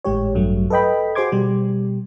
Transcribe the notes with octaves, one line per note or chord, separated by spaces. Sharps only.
G#1 A2 G#3 G4 C#5
A1 G2 F#3 A3
A4 B4 D#5 G5 B5
F#4 G#4 C5 C6 D6 G#6
B2 G3 G4